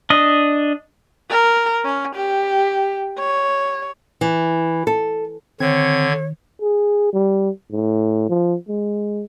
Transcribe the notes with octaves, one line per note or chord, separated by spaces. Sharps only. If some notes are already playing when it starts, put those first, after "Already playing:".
D4 D#5
A#4
C#4
G4
C#5
E3
A4
D3 D#3 C4 C#5 G#6
G#4
G3
A2
F3
G#3